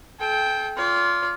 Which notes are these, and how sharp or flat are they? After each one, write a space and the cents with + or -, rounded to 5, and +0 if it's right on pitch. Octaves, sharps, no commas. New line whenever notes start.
A4 -40 G5 +0
F4 +0 D5 -40